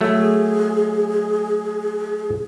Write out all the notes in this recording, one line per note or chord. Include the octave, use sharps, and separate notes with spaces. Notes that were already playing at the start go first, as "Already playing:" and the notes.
F#3 A3 G#4